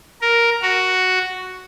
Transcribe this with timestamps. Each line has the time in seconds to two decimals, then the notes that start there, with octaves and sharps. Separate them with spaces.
0.21 A#4
0.62 F#4